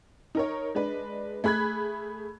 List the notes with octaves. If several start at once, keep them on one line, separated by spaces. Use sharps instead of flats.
D#4 A#4 C#5
G#3 D4 B4
A3 G#4 B5 F#6 G#6